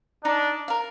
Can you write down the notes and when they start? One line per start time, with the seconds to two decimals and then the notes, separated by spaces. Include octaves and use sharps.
0.25 D4 D#4
0.68 A#4 F5